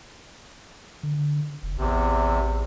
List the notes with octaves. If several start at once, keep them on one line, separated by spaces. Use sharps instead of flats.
D3
F1
A1 E2 C3